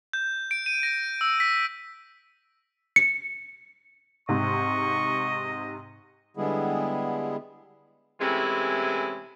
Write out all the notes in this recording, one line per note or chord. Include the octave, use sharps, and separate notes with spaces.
G6
D7
D#7
A#6
E6
B6
C#7
G#2 C3 D#5 C#6
D3 G3 G#3 B3 E4 G#4
C3 E3 G#3 A3 C#4 E4